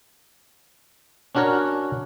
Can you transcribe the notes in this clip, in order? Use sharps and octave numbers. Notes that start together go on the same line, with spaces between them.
C#4 D4 F#4 A#4 C#5